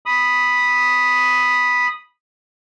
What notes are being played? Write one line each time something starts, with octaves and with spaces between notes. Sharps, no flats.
B5 D#6